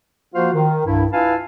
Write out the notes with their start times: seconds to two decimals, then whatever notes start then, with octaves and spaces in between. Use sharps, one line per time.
0.34 F3 A#3 F4 F#4 C5 F5
0.54 D#3
0.87 C2 G2 E4
1.12 E4 F4 B4 F5 G#5 A5